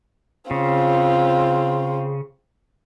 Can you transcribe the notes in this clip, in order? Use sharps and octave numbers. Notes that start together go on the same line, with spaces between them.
C#3 C4 F4